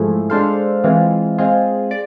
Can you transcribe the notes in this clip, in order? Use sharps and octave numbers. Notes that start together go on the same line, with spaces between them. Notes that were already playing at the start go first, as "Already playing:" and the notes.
Already playing: G#2 F3 A3 E4 G#4
G#3 D4 A4 C5 F5
E3 G#3 C4 F4
G#3 C4 F4 G#4
D5